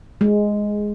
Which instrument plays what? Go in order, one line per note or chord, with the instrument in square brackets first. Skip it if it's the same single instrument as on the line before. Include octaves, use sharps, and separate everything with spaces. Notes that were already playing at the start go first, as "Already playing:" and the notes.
[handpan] G#3